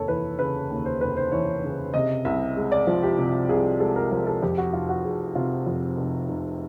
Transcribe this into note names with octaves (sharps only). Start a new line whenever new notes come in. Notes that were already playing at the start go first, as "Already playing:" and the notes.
Already playing: F1 D#2 A4 A#4 C#5
E3 B4
C#3 B4
D#2
C5
F1 B4
C5
E3 C#5
C#3
C3 D#5
C2 E5
G#3
D5
F3
G4
C3
C2 G#4
G#3 A4
A#4
F3 A#4
A4
F2 G4
F#4
F1 F4
F#4
F1 G#4
C3 F4
F2
F1
F1